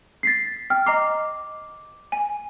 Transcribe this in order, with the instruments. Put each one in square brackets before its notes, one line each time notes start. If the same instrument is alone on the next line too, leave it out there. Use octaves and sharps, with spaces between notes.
[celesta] A6 B6 C7
[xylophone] G5 [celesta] F6
[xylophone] D#5 A#5 C7 [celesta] D6
[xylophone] G#5